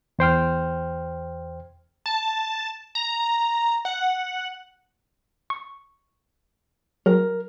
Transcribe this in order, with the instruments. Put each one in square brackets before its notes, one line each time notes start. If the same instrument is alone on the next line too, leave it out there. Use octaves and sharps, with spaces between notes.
[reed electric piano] E2 C5 G5 F6
[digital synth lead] A5
A#5
F#5
[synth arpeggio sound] C#6
[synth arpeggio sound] F#3 [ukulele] A#4